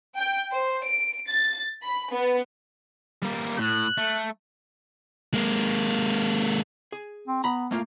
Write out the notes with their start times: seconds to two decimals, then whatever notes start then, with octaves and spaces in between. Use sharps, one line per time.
0.17 G5
0.54 C5
0.83 D7
1.27 A6
1.82 B5
2.12 B3
3.22 G3 A#3
3.59 A2 F#6
3.98 A3
5.34 G#3 A#3
6.92 G#4
7.28 C4
7.44 B3 A#5 B5
7.71 A3 A#3 F4